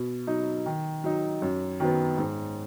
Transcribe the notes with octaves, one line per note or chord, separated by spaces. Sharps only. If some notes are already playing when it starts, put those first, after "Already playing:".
Already playing: B2
F#3 D#4
D#3
F#3 D#4
F#2
D#3 F#3 B3
G#2